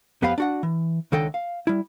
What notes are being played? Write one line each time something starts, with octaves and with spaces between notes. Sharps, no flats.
F2 B3 G4 B4 F5 B5
D4 F#4 F#5
E3
C#2 D3 D#3 A4 D#5 G5
F5
G3 E4